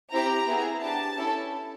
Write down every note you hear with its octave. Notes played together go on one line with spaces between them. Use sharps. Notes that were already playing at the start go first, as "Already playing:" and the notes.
C4 E4 G4 A#5
B3 E4 G#4
B3 D4 G4 A5
C#4 E4 A4